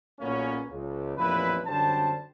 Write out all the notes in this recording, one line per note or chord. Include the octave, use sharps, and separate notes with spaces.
B1 A#2 A#3 B3 C#4
C#2
A1 F2 A#2 E4 B4
F#2 D3 G3 C5 A5